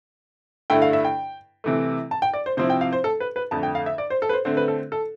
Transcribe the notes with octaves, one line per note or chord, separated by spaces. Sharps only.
G2 D3 A3 E4 G5
F5
E5
G5
C3 E3 A3
A5
G5
D5
C5
C3 F3 C4 E4 C5
G5
F5
C5
A4
B4
B4
F2 D3 A3 A5
G5
F5
E5
D5
C5
A4
B4
C5
D3 A3 C4 C5
B4
A4
A4